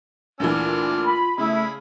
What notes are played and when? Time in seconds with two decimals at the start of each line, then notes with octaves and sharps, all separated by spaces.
0.40 D2 A#2 E3 D4 F6
0.59 F4
1.04 B5
1.38 C#3 A3 E4 G#4 B5